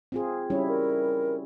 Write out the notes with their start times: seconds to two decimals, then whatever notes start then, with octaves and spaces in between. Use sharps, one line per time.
0.12 C4 F4 G#4
0.50 G3 C#4 E4 C#5
0.68 A#4